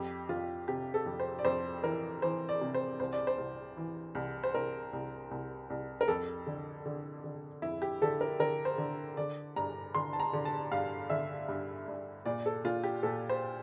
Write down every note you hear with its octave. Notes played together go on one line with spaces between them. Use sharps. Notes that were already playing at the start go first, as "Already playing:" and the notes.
Already playing: F2 G4
F2 F4
C3 G4
A4
F2
C5
D5
F2 C5
E3 A#4
E3 C5
D5
C3
C5
C2 C5
D5
C5
C2
E3
C2
C5
C2 A#4
C2
C2
C2
A#4
F2 A4
D3
D3
D3
F2 E4
G4
D3 A4
A#4
D3 A#4
C5
D3
D3 D5
G2 A#5
D3 C6
A5
A#5
D3
A5
G2 F5
D3 E5
G2
G2
A#2 D5
A4
A#2 F4
G4
A#2 A4
C5